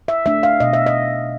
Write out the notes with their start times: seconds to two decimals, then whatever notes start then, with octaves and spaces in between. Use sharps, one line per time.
0.08 E5
0.26 A3 D4 E5
0.43 F5
0.60 B2 D#5
0.73 E5
0.86 D#5